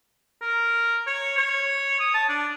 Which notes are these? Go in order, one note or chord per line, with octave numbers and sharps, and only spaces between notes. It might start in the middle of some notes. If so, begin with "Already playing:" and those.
A#4
C#5
C#5
D#6
A5
D4